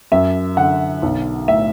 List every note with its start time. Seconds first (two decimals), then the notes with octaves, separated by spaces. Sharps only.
0.12 F#2 E5
0.57 D3 F#5
1.02 B1
1.48 A2 E5